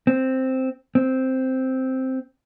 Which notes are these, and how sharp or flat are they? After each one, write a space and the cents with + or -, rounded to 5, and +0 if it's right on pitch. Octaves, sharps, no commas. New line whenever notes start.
C4 +0
C4 +0